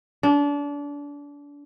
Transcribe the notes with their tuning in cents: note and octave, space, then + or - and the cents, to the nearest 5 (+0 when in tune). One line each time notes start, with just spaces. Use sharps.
D4 -30